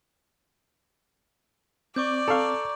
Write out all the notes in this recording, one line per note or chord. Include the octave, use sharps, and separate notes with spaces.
C4 D5 C#6 D6 G6
A4 F5 A#5 C#6